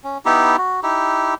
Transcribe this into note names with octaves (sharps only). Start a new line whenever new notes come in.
C#4
B3 D#4 E4 G4
F#4
D#4 E4 G4